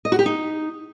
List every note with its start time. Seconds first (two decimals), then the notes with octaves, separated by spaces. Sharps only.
0.05 D#5
0.12 F#4
0.19 G4
0.26 D#4